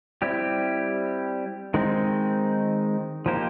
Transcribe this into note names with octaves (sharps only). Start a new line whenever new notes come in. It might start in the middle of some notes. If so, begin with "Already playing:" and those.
G3 C4 E4 G4
D#3 G#3 C4 D#4
F3 A#3 D#4 G4 C5